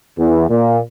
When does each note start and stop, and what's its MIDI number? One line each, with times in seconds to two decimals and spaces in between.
0.18 0.44 40
0.49 0.80 46